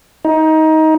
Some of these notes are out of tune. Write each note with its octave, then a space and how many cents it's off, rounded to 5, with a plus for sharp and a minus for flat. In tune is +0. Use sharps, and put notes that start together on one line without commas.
D#4 +20